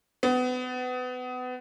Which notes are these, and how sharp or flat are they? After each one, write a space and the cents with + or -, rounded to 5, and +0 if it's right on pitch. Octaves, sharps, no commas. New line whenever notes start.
B3 +30